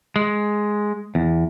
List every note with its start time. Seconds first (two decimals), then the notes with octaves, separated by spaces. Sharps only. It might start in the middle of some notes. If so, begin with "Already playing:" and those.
0.16 G#3
1.15 E2